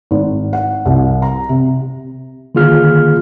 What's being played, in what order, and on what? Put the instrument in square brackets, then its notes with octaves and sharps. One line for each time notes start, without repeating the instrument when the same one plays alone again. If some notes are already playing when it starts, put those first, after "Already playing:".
[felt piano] G#1
F#5
C2
A#5
C3
[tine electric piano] D3 D#3 A#3 F4 G#4 F6